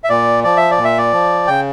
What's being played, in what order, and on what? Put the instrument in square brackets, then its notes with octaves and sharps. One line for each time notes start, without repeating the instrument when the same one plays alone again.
[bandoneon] E5
A#2 D5
F3 D5
E5
D5
A#2
E5
D5
F3
C#3 G5